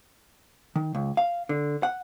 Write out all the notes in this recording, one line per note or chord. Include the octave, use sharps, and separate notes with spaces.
D#3
C#2
F5
D3
F#5